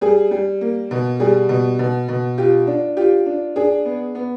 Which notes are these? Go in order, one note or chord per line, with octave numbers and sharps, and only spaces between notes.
G3 G#4
G3
A#3
B2
G3 G#4
B2
B2
B2
F4 G4
D4
F4 G4
D4
D4 G#4
B3
B3